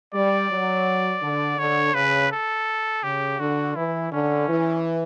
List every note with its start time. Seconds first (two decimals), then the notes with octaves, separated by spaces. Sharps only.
0.14 G3 D5
0.50 F#3
1.22 D3
1.58 D3 C#5
1.95 C#3 B4
2.31 A4
3.03 C#3 G4
3.39 D3 F#4
3.76 E3 E4
4.12 D3 C#4
4.47 E3